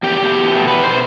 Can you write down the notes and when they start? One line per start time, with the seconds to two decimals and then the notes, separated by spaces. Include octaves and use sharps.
0.03 E2 G4
0.20 B2 A3
0.35 E2
0.52 B2 A3
0.67 E2 B4
0.83 B2 A3 C5